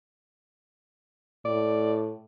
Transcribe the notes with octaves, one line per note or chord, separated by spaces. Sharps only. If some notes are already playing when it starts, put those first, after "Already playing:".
A2 D5